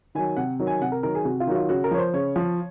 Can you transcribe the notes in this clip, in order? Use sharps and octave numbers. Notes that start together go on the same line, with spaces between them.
D#3 F#3 G#5
C3 F#5
D#3 F#3
G#5
C3 F#5
A#4
D#3 F#3 A#4
G#4
C3 F#4
F4
D#3 F#3 F#4
F4
C#3 F#4
A#4
F3 C#5
C5
C#3 C#5
F3